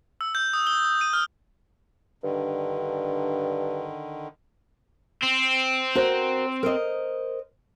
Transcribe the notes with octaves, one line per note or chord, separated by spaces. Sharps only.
E6
G6
D#6
G7
D#6
D#7
F6
G2 D3 D#3
C4
F#4 A#4 C5
A#4 C5 D#5